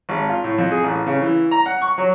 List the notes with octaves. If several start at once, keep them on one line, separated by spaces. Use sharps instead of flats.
G#1
F4
A2
F2
G#4
A1
C#3
E3
A#5
F#5
C#6
F#3